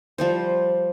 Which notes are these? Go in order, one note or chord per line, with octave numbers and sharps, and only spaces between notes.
F3 G3 C5